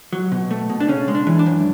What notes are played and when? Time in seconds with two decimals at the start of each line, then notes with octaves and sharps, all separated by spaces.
0.13 F#3
0.32 B2
0.51 A3
0.70 B2
0.80 D4
0.88 C#3 C#4
1.08 G#3
1.15 D4
1.27 E3
1.39 D4
1.46 F#2